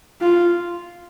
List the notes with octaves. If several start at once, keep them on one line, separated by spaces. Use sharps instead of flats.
F4